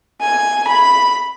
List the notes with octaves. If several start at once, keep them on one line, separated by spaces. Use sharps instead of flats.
G#5
B5